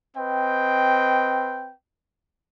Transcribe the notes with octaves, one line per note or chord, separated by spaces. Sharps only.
C4 B4 D#5 G5